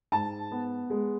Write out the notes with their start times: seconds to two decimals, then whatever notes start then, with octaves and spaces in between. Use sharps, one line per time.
0.12 G#2 A5
0.52 B3
0.90 G#3